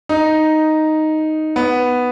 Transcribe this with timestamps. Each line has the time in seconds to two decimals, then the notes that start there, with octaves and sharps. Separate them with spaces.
0.09 D#4
1.56 B3